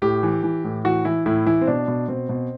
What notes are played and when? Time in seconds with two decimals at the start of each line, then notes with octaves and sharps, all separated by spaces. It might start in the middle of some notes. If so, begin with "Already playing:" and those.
0.02 A2 G4
0.23 E3
0.43 E3
0.64 A2
0.85 E3 F#4
1.05 E3 E4
1.26 A2 E4
1.46 E3 E4
1.61 C4
1.67 B2 D4
1.88 B2
2.08 B2 C4
2.29 B2